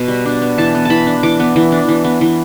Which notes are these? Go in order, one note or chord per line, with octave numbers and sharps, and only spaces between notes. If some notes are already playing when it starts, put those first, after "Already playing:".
Already playing: B2 B3
G3
D4
B3
E3 A5
B3
E3 A5 B5
D4
E3 D6
B3
E3
D4
E3
B3
E3